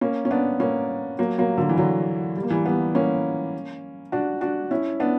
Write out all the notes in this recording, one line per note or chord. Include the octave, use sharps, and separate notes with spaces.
A#3 C#4
C#4
B3 D4
A#3 C#4
F#3 A#3
F#3 A#3
D3 F#3
E3
D3 F#3
G3
A#3
E3 G3
G3 B3
A#3 C#4
D4 F#4
D4 F#4
C#4 E4
B3 D4